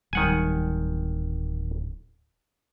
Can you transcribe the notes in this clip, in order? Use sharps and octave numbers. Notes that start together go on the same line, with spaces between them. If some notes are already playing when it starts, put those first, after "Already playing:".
D1 D#3 G3 F#5 G#5